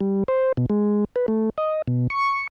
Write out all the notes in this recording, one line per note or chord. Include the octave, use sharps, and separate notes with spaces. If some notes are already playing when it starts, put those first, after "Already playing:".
G3
C5
B2
G#3
B4
A3
D#5
B2
C#6